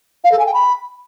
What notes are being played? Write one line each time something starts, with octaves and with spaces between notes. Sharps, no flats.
F5
A4
G#5
G5
B5